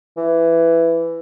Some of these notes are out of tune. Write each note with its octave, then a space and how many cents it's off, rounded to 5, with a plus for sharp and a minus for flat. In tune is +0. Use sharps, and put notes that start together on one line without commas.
E3 +10